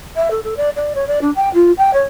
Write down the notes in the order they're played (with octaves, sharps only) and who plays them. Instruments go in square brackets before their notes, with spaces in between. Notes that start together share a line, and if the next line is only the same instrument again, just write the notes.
[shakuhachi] E5
A4
A4
D5
D5
C#5
D5
D4
G5
F4
G5
C#5